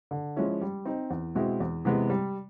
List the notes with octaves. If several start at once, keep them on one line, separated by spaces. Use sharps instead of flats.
D3
F3 G#3 C#4 E4
G3
C4 D#4
E2
B2 G#3 C4 E4
E2
C3 E3 G#3 B3
G3